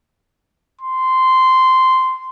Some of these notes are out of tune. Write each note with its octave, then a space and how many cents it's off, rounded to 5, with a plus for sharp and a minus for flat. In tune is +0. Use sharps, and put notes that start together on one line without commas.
C6 -10